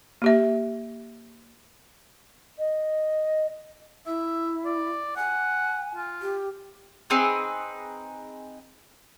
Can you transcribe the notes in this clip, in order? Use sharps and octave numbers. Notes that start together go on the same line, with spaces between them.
A#3 G4 E5
D#5
E4 E5
D5
F#5 G#5
F4
G4
C4 D#4 G#4 B4